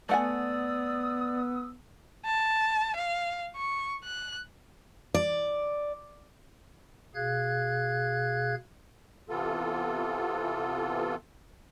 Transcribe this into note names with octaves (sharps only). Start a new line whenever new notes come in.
A3 B3 D5 F#5 G#5 D#6 E6
A5
F5
C#6
F#6
D5
B2 G#4 F5 F#6 G#6
C3 E3 B3 F4 A4